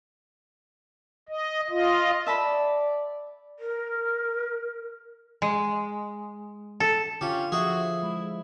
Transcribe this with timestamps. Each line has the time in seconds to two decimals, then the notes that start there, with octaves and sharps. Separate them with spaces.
1.29 D#5
1.70 F4 D#5
2.27 D5 E5 A5 B5
3.58 A#4
5.42 G#3
6.80 A4
7.21 D3 C#4 F4 G4 F5
7.52 F3 F#4 G#4 E5
8.03 G#3 E4